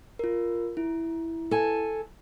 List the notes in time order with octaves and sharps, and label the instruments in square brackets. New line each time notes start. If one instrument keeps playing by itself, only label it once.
[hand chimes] F4 A#4
E4
[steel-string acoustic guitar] A4 G#5